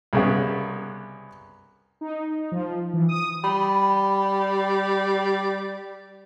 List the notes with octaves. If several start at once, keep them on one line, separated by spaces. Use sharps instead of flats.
C2 C#3 B3
D#4
F3
E3
D#6
G3 B5